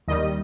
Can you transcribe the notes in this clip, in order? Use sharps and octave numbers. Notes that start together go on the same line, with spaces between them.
D#2 D#3 G3 D#5